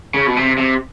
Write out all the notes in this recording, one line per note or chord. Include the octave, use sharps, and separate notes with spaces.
C#3
B2
C3
C3